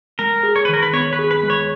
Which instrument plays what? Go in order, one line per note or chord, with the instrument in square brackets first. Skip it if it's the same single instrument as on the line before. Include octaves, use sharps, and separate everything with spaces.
[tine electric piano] G#3 [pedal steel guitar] A#4
[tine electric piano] G#4
[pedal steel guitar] C#5
B4
[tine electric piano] D#3 [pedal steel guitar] A#4
[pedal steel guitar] B4
[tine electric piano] B3 [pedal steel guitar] C#5
[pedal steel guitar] B4
[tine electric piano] G#4
[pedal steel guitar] B4
[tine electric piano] G#3
[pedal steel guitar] C#5